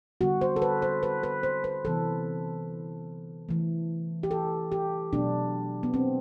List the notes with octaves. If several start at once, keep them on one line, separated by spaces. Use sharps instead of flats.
D3 G3 B3 F#4
C5
A4
B4
C5
B4
B4
C5
B4
C3 E3 B3 A4
E3 A3
G4
A4
G4
B2 F#3 A3 D4
B3
C4